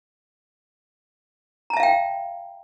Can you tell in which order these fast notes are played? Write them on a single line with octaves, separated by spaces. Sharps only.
A#5 A5 E5 F5 G5